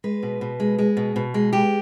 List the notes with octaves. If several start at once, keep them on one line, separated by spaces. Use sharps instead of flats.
G#3 B4
B2
B2
G#3
G#3
B2
B2
G#3
G#3 G4